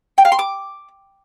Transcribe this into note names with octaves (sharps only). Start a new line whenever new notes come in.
G5
F5
C6
D6